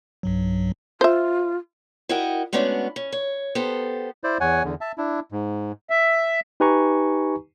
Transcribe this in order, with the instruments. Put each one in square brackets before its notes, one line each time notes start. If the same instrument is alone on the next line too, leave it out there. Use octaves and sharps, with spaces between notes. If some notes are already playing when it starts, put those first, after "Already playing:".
[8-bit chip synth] B1 G2 F#3
[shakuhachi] F4 [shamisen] C5 E5
[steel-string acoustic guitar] E4 F#4 A#4 D#5 F#5 G5
G#3 A3 B3 C#4 D4 F#4
C#4
C#5
B3 G4 A4 C5
[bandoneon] E4 C5 D5
E2 C#5 F#5 G#5
E2 D3
E5 A5
D4 E4
G#2
[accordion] E5
[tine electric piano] D#4 G4 B4 G#5 A#5 C#6